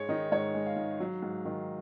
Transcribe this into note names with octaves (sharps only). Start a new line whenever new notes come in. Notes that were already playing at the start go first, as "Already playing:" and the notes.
Already playing: G#2 G#3 C#5
D#3 D#4
G#2 C#5
G#3
F5
G#2
F#3
G#2
D#3